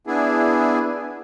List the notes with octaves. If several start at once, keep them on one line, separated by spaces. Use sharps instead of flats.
B3 D4 E4 G#4